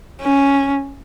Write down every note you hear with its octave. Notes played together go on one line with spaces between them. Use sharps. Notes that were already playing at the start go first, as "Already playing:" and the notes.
C#4